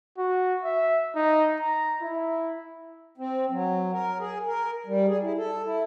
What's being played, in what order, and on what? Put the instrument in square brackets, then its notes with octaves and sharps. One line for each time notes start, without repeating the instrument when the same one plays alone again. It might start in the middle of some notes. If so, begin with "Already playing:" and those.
[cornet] F#4
E5
D#4
A#5
E4
[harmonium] C4
F#3
A#4
G#4
A#4
G3
G#4
E4
A4
E4